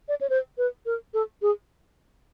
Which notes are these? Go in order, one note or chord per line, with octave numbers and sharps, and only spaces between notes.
D5
C#5
C5
B4
A#4
A4
G#4